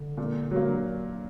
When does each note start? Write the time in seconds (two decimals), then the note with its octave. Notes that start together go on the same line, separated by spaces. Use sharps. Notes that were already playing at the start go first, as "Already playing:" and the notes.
Already playing: D3
0.17 A#2
0.51 F#3 A#3